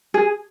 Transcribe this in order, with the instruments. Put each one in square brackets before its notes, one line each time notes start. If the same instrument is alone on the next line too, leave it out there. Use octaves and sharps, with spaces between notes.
[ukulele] G#4